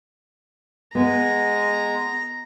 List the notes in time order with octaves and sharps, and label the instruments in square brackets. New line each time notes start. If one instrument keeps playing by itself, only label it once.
[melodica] G#3 [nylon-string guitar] B3 [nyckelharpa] A#5